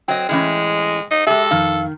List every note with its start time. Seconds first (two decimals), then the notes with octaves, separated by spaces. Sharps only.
0.08 F#3 C4 D#5 G5
0.29 A2 E3 G#3 C#4
1.11 D#4
1.27 G#3 G4 A4 E5
1.51 F2 D#3 F5